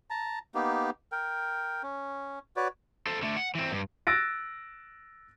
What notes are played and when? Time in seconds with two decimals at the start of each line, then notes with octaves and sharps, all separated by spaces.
0.10 A5 A#5
0.55 A#3 B3 D#4 G4
1.12 A#4 G5
1.83 C#4
2.56 F#4 B4 C#5 D5
3.07 A4 C5
3.22 D3 A3
3.37 F#5
3.55 E3 C4
3.72 G2
4.07 E6 F#6 A6 A#6 D7